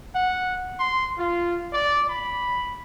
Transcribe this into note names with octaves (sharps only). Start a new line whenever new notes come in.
F#5
C6
F4
D5
B5